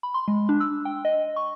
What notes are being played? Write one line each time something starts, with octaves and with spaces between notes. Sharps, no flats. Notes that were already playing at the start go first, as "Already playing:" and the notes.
B5
C6
G#3
D4
E6
G5
D#5
C#6